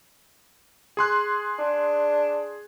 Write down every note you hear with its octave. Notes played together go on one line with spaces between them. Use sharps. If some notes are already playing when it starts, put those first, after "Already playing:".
G#4 C6 F#6
D4